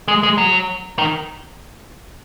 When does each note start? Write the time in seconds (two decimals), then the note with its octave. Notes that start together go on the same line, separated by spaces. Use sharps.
0.08 G#3
0.23 G#3
0.38 F#3
0.99 D#3